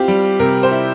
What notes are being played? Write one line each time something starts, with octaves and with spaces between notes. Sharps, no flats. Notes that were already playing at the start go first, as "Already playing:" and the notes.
Already playing: C4 E4 F4 G4
G3
C3 A#4
C5
E4